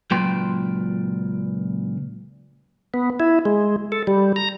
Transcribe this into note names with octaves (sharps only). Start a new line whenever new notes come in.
C#2 A#2 F#3 B4 G5 C6
B3
E4
G#3
A4
G3
A#5